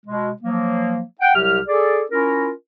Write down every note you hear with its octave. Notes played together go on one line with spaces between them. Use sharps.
B2 G#3
F3 F#3 A#3
F#5 G5
C2 C3 F#3 G4 F6
G#4 A4 D5
C#4 E4 F4 A#4